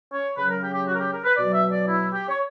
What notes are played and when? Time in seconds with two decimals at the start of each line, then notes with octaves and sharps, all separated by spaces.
0.12 C#5
0.37 C#3 F#3 B4
0.49 A#4
0.62 G4
0.74 G4
0.88 F#4
0.95 A#4
1.00 G4
1.12 A#4
1.25 B4
1.37 B2 F#3 D5
1.54 E5
1.71 D5
1.88 E4
2.12 G4
2.28 C#5